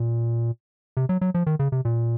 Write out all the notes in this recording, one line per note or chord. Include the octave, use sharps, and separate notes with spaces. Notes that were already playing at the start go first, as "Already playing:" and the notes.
Already playing: A#2
C3
F#3
F#3
F3
D#3
C#3
C3
A#2